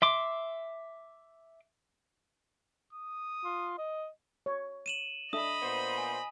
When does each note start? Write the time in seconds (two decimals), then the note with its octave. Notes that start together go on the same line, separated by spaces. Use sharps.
0.02 E5 C6 D6
2.93 D#6
3.44 F4
3.78 D#5
4.46 C#5
4.86 D#7 E7 F#7
5.33 D4 A4 D#5 E5 B5 D#6
5.62 A#2 B3 C5
5.98 G#5